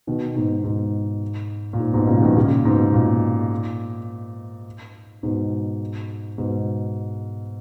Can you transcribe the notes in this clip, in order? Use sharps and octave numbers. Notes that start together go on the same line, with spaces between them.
B2 D#3
G#2 B2
G#2
A#2
G#2
G#2 B2
A#2 C#3
F3
B2 D#3
D#3
A#2 C#3
G#2 B2
A#2
G#2 B2
G#2 B2